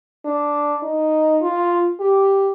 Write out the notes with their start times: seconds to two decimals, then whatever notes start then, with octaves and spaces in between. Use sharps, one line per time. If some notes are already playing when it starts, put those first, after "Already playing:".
0.25 D4
0.82 D#4
1.41 F4
2.00 G4